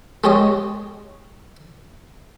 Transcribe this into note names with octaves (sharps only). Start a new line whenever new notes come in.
G#3 G4 C#5 D#5